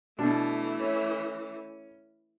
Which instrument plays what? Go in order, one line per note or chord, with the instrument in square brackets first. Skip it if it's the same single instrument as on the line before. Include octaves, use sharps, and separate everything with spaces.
[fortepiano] B2 D4 [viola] E3 A3
[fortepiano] C#4